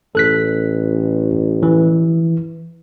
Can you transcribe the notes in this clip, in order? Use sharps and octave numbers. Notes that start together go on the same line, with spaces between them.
A1 A4 F#6 B6
E3